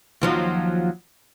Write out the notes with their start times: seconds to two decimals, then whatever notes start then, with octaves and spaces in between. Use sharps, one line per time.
0.21 D#2 F3 F#3